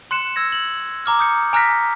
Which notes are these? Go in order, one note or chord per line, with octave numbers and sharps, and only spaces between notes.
C6 F#6 C#7 E7
E6 G#6 A#6
F#7
A#5 D6 F6
D#6 G6 C#7
G#5 A#5 F6 F#6 A#6 B6